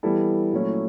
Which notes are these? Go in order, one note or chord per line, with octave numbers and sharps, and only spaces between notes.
E3 G3 B3 E4 A4
A#2 F#3 A3 C#4 E4